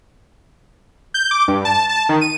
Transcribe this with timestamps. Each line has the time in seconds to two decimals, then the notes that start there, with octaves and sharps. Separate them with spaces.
1.14 G6
1.31 D6
1.48 G2
1.65 A5
1.89 A5
2.09 D#3
2.21 D#7